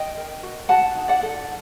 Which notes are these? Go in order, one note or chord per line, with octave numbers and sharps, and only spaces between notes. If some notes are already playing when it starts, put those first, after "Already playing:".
Already playing: D#5 G5
A#4
F#4
F#4 F#5 A5
D#4
D5 F#5
A4